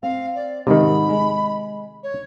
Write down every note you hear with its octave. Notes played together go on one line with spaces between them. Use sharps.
C4 F5
D5
G#2 C3 D#3 D#5 B5
G#3
C#5